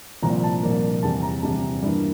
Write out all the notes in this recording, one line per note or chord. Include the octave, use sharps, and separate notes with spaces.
C2 A#2 F3 A#3 A#5
A5
C2 A#2 F3 A#3
E2 C3 G3 A5
A#5
E2 C3 G3 A5
G2 E3 A#3